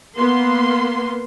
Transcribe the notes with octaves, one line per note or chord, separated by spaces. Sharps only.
A#3 B3 C6